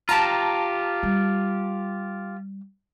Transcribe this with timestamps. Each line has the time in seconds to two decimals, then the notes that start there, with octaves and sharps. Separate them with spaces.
0.09 F4 G4 A5 A#5
1.03 G3